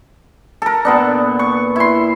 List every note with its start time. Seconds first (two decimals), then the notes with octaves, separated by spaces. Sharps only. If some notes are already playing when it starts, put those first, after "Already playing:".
0.62 A4 A#4
0.85 A#2 B3 D4
1.39 C#6
1.76 E4 C6